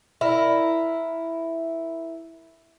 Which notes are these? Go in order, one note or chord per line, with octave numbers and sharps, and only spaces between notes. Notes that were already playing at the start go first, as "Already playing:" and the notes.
E4 A#4